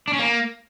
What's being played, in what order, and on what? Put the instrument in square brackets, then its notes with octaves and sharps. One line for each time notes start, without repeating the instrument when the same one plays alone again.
[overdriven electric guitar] D4
C#4
A#3